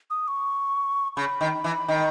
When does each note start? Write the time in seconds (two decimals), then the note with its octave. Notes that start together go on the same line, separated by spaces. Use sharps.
0.10 D#6
0.28 C#6
1.16 C#3 B5
1.41 D#3
1.64 E3
1.88 D#3